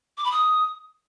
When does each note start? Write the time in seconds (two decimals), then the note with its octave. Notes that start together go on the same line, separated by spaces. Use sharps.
0.17 D6
0.24 B5
0.31 D#6